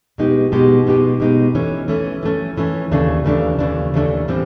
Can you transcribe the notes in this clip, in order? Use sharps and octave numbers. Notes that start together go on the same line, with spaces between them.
B2 G#3 B3 D#4 G4
B2 G#3 B3 D#4 G4
B2 G#3 B3 D#4 G4
B2 G#3 B3 D#4 G4
E3 A3 C#4
E3 A3 C#4
E3 A3 C#4
E3 A3 C#4
D#2 C#3 E3 A3 D4
D#2 C#3 E3 A3 D4
D#2 C#3 E3 A3 D4
D#2 C#3 E3 A3 D4
A2 E3 G3 C4